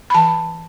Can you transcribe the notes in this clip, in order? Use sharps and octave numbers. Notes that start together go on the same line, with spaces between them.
B5
E3 A5